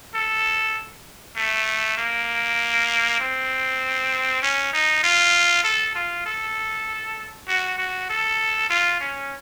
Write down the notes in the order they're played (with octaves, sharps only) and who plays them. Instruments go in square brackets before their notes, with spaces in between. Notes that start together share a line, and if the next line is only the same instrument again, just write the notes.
[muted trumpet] A4
A3
A#3
C4
C#4
D#4
F4
A4
F4
A4
F#4
F#4
A4
F4
C#4